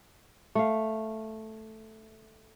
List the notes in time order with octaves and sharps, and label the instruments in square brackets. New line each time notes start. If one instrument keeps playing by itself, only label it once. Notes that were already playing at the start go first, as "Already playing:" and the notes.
[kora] A3 F5